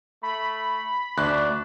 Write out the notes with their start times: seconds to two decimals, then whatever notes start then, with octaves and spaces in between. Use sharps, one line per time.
0.23 A3 B5
1.18 D2 D4 F#6